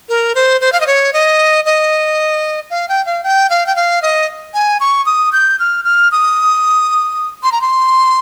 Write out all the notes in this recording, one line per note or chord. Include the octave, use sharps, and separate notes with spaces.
A#4
C5
C5
F5
D#5
C#5
D#5
D#5
F5
G5
F5
G5
F5
G5
F5
D#5
G#5
C#6
D#6
G6
F6
F6
D#6
C6
A#5
C6